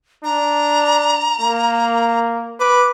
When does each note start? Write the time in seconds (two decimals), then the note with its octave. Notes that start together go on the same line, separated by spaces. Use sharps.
0.24 D4 A#5
1.41 A#3
2.60 B4 D6